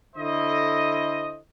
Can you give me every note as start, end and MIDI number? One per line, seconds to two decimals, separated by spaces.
0.16 1.37 50
0.16 1.37 64
0.16 1.37 69
0.16 1.37 72
0.16 1.37 75